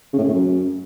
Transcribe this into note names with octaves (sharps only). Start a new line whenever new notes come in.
C#3
A2
C#3
A2
F#2